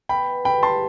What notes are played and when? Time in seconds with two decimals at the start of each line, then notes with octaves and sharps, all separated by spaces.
0.09 B3 G5 B5
0.27 E3
0.45 G2 G5 B5
0.63 G2 A5 C6